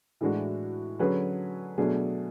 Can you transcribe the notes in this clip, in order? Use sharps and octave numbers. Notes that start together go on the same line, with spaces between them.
A2 E3 G#3 D4 F#4
D3 F#3 C#4 G#4 B4
B2 F#3 A3 D4 G#4